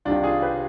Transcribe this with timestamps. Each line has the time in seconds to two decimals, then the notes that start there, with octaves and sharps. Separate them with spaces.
0.05 C2 C3 D#3 D4 F4
0.24 F4 G#4
0.42 G4 B4